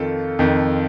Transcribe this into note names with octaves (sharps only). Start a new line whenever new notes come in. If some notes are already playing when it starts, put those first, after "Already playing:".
Already playing: F2 D#3 F4 A4
F2 D#3